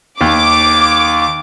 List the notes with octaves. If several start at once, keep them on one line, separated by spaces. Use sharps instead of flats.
D#2 D6